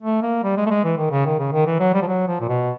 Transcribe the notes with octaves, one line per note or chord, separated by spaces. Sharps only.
A3
A#3
G3
G#3
A3
G#3
E3
D#3
C#3
D#3
C#3
D#3
E3
F#3
G3
F3
F#3
F3
A#2
B2